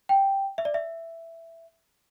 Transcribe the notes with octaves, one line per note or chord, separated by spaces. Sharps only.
G5
E5
D5
E5